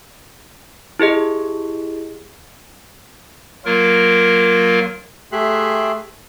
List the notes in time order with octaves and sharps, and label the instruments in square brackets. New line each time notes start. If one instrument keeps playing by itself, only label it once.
[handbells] E4 G4 G#4 D#5
[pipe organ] F#3 A#3 F4 A#4
[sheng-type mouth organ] A3 G4 G#4 E5 C6 F#6